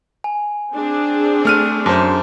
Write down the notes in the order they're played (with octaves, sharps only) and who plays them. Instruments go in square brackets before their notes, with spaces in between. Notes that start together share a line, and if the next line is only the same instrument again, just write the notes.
[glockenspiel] G#5
[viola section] C4 D4 G#4
[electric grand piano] A3 F6 D#7
[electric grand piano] F#2 C5 [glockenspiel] A5 D6